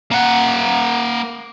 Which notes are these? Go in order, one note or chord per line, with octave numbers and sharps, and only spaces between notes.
A#3 F#5